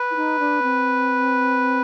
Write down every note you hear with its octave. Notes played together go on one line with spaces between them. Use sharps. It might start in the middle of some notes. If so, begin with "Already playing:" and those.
Already playing: B4
E4
D#4
D4
C4